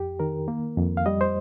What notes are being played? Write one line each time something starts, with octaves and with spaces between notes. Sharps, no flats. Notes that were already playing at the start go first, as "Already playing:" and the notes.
Already playing: F2 G4
D#3 A#4
A#3
F2
F5
G3 D#5
C5